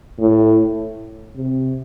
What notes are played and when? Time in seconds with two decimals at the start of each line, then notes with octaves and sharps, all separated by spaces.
0.19 A2
1.36 C3